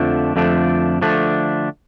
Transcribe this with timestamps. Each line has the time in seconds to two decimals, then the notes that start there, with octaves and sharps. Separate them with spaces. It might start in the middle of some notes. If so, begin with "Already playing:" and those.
Already playing: F2 D3 F3 A3 D4
0.36 F2 D3 F3 A3 D4
1.01 D3 F3 A3 D4